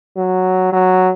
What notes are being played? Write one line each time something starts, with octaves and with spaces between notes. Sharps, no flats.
F#3
F#3